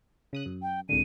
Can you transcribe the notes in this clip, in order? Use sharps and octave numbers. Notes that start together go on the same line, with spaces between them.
C#3 D#6 F#6
F#2
G5
C2 G#2 D3 D#7